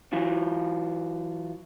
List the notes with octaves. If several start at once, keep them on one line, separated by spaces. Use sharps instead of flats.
E3 F#3 F4